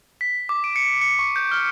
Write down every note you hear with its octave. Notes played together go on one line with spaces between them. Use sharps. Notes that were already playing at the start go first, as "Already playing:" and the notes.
B6
D6
D7
C#7
C#7
C#6
G6
F6